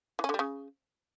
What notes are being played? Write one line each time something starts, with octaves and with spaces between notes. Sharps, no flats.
E3
C#4
D3
G3
C#3